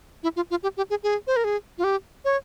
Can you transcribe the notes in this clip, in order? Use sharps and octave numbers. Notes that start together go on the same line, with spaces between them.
E4
F4
F4
G4
G4
G#4
G#4
C5
A#4
G#4
F4
G4
C#5